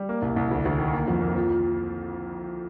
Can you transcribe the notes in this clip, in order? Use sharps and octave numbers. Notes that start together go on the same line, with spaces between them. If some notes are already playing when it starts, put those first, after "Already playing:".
Already playing: G3
A#3
C2
C2
D2
D2
D#3
A#3
F2
A#3
F3